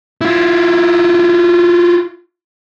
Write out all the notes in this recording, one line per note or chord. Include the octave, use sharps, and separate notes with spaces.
E4 F4